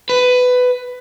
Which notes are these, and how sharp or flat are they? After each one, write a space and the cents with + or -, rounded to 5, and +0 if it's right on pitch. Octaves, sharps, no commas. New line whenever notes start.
B4 +15